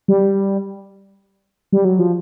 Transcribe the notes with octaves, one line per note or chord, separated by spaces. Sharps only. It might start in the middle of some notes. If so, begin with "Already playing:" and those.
G3
G3
F#3
F3